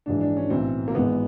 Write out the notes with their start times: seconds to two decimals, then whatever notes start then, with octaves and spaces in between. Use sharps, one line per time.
0.06 A#1 G#2 E3 D4
0.21 D4
0.37 C#4
0.50 B1 A2 E3 C4
0.88 A#3
0.95 G#1 G#2 E3 B3